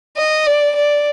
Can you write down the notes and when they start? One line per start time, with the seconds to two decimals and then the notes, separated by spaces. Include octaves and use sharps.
0.17 D#5
0.47 D5
0.76 D5